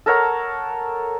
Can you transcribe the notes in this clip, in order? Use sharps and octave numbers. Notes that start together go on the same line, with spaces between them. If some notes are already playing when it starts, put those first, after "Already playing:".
A4 A#4 C#5 F#5